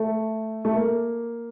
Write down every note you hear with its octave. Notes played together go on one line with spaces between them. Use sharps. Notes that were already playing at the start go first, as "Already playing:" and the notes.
Already playing: A3
A3
A#3